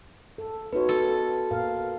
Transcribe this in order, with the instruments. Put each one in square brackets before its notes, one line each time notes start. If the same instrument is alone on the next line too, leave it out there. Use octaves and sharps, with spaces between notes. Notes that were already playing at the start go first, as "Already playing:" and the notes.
[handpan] A4
[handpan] B3 D#4 C#5 [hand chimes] F#4 B4
[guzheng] A4
[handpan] A#2 A#4 F5